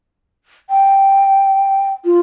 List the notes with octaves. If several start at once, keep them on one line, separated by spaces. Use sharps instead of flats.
G5
F4